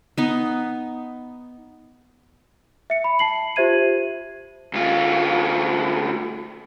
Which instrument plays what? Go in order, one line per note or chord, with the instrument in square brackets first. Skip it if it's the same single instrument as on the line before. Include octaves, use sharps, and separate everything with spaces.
[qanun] B3 D#4
[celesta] E5 C#7
B5
A5 C7 F#7
F4 G4 C5 E5 G#6 D#7
[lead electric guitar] D2 F4